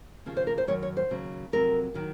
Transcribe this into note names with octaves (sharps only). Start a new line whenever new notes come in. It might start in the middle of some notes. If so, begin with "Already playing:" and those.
D#2 C#3 F3
C5
A#4
C5
F#2 D#3 F#3 C#5
C#5
C5
D#2 C#3 F#3
F2 C3 F#3 A#4
D#3 F#3